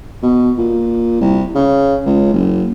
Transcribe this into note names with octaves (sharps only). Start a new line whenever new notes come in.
B2
A#2
C2
C#3
C#2
F#1